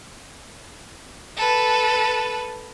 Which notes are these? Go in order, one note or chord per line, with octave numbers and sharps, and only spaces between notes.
A4 B4